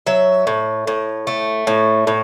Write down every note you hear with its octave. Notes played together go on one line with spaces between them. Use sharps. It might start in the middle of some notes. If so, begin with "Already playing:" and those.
F#3 E5
A2
A2
A3
A2
A2